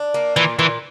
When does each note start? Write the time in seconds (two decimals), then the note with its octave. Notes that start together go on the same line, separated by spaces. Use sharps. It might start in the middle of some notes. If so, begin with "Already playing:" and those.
Already playing: D4
0.14 A#3
0.36 A#2 E3
0.59 A#2 E3